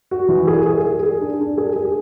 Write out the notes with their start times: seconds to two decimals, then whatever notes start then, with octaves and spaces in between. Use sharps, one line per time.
0.11 F#4
0.29 E3
0.47 G#4
0.66 G#4
0.84 G#4
1.03 G#4
1.21 D4
1.39 D4
1.58 G#4
1.76 G#4